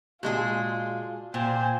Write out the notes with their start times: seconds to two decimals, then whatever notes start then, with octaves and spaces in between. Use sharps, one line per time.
0.23 A#2 G#3 F4 F#4 G#4 D5 A5
1.34 A#2 C5 G5 G#5